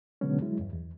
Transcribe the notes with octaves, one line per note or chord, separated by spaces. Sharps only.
B2 D3 F#3 G#3 B3 C#4
F#3 G#3 E4
E2 G2
E2